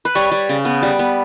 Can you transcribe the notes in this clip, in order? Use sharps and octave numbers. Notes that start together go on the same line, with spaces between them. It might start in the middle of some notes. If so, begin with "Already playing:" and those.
B4
G3 C#5
G3
C#3
B3
G3
B3